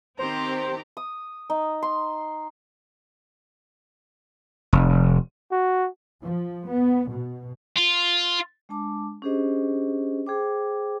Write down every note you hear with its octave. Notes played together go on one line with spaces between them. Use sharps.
D#3 C4 G4 C5 A#5
D#6
D#4
C6
F1
F#4
F3
B3
B2
F4
G#3 D4 A5 D6
C#4 D4 G4 G#4 C5 D#5
G#4 C5 G5 D6